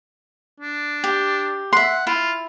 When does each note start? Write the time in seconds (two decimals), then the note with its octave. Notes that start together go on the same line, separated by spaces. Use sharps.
0.60 D4
1.04 G4
1.73 E5 F#5 C6
2.07 E4 F4